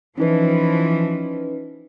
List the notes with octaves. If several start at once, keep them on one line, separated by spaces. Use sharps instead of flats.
E3 F3 C#4 D#4 B4